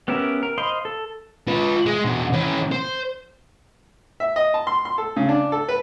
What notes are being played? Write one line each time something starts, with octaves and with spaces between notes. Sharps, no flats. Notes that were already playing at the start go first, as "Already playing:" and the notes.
B3 C#4 G4 A#4 E5
A#4
C5 D#5 F5 B5 C6
A4
F4 B4
G#3
E2 B2
E3 C#4
C5
E5
D#5
A5
C6
C6
A4
C#3
D4
A4
B4